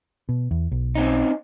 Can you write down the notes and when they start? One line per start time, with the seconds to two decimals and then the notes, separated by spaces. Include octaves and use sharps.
0.29 B2
0.51 E2
0.72 B1
0.95 C4 C#4 D#4